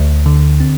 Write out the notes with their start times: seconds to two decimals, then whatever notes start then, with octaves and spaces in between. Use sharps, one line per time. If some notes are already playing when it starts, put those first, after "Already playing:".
Already playing: D2
0.26 D3
0.60 C4